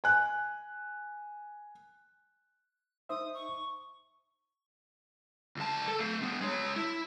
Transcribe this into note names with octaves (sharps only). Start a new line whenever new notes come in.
G#5 F#6
D#4 C5 E5 D#6
C#6
C#2 A5
A4
A3 F5
B3 D4
G#3 C#5
E4